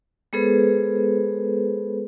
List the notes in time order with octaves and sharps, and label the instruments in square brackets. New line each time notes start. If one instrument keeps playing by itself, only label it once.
[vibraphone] G#3 B3 G#4 A4 B4 C5